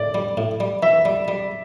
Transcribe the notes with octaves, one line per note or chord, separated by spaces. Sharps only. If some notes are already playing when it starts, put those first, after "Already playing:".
Already playing: A2 D5
G3
A2
G3
E3 E5
G3
G3